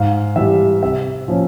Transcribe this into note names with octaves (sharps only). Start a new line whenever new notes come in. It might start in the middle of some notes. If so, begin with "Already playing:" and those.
Already playing: G#2 F5
E3 G3 E5
C3 E5
F3 A#3 C#4